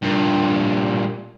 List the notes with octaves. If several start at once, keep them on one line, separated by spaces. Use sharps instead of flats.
G2 A#2